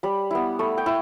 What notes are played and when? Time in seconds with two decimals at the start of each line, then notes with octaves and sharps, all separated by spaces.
0.03 G3 B5
0.31 B3 E4
0.59 A3
0.78 G5
0.86 E4